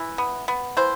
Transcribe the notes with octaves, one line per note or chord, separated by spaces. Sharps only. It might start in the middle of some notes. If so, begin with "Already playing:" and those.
Already playing: E3
B3
B3
E3 C5